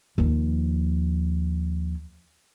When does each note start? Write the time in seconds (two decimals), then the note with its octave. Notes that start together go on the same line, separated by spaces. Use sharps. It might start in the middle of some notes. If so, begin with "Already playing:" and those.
0.18 D#2 F3